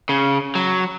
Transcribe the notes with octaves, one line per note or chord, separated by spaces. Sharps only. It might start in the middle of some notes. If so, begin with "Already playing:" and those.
C#3
F#3